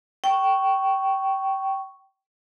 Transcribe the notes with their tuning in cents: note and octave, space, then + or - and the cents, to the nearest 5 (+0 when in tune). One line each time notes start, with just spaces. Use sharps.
G5 -20 C#6 +0